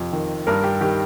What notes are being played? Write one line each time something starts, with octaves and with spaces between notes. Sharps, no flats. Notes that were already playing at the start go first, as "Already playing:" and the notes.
Already playing: F2 C3
D#3
G2 A#4
G4
D#3 G4